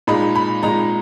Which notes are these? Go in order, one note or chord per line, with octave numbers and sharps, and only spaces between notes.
A#2 G#3 D#4 B5
B5
A#2 G#3 D#4 A#5